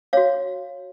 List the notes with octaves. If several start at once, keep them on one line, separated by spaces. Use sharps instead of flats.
F#4 C#5 F5